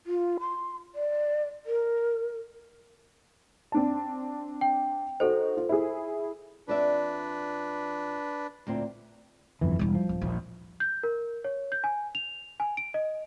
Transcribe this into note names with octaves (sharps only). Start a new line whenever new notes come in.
F4
C6
D5
A#4
C4 D4 A5
G5
D#4 F#4 A4 C5
F4
E4 G#4
F2 D4 B4 D5 E5
D2 A#2 C4
G1 F2 E3
E1 G3 E4
F3
D1
A#1 D#2
G6
A#4
C#5
G6
G#5
F7
G#5
D7
D#5